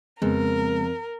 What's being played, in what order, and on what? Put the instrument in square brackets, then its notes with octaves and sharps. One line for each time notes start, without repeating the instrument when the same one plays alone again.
[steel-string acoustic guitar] F2 [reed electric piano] C#3 G#3 B3 [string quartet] A#4